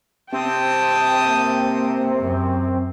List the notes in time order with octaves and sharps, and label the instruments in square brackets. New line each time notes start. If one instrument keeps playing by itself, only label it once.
[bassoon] C3 [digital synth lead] C4 [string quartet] G5 A5 D#6
[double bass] A#3
F#2